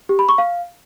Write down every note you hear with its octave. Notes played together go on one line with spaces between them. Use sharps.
G4
B5
C#6
F5